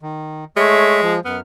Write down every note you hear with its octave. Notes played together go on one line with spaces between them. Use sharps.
D#3
G#3 A3 C#5 E5
F3
F#2 B3 F6